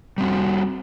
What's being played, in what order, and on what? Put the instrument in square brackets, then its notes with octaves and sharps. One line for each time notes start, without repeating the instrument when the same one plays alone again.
[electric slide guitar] G3 C4 F#4